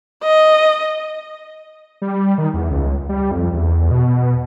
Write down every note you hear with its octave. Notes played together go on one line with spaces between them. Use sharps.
D#5
G3
D#3
E2
C#2
G3
F2
E2
B2